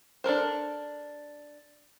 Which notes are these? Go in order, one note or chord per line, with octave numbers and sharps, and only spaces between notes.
D4 A4 A#4 C5